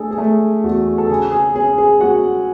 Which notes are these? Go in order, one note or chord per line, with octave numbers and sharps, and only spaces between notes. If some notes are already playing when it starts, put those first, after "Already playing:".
Already playing: A3 D4 G#4 A4
G#4
G#3 A3 A4
E2 F#4
A4
C#3 G#4
G#4
C#4 G#4
G#4
G#3 F#4 F#5